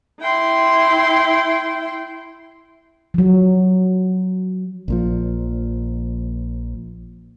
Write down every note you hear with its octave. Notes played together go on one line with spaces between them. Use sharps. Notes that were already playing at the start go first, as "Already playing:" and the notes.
E4 G5 C6
F3 F#3
A#1 A#2 F3